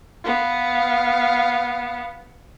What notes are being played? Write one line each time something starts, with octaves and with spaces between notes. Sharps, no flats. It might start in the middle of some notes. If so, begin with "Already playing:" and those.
B3 F5